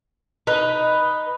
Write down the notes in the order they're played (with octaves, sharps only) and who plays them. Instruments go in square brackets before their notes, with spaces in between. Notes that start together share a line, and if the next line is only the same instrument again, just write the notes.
[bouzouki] D#4 B4